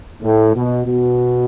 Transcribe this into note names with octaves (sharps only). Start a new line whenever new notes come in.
A2
B2
B2